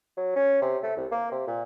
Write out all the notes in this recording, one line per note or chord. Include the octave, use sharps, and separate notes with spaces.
F#3
C#4
C3
A3
C2
A#3
C3
A#2